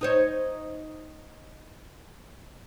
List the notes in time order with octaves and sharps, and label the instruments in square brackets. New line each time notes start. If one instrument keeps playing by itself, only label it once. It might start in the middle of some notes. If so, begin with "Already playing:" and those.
[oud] D#4 C5 C#5